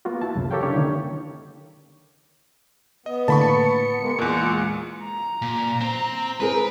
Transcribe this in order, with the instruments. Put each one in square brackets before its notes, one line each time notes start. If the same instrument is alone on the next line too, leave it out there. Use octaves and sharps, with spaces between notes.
[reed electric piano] A#3 B3 F4 F#4
E4 A5
C2 F#2 C#3
G4 A4 A#4 C#5 F5 G5
C#4 D4 E4 G4 C#5
D3 D#3 A#3
[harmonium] B3 [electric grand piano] D#5
[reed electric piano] A2 A#3 [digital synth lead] D3 [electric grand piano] A5 B5 C#6
[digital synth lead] C#7
[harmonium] G#3 A#3 B3
[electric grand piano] E2 A#2 [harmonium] G#3 [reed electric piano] C#6 D6 F#6
[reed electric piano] F4
[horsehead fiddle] A#5
[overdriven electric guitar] A#2
C4 C5
[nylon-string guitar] C4 G#4 A#4 [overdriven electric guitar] B4